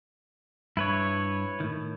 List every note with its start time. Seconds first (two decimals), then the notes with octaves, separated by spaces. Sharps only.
0.77 G2 E4 B4 C#5
1.60 A2 D#3